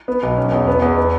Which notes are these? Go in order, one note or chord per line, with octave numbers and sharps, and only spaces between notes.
B3
B1
C#4
E2
B3
E2
B3